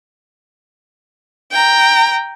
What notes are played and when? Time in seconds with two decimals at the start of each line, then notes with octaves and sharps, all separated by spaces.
1.52 G5 A#5